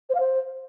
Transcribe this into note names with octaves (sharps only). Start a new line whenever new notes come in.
C5
F5
C5